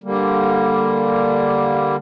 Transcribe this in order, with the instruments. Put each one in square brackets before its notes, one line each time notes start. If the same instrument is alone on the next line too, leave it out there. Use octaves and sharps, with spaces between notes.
[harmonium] D3 G3 A#3